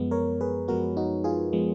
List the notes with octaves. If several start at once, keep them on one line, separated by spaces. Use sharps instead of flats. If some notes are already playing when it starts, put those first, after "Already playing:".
Already playing: F#2 F3 G#3 B3
A#4 C#5
G#4 B4
F#2 F3 G#3 B3 F#4 A#4
D#4 F#4
F4 G#4
F3 G#3 B3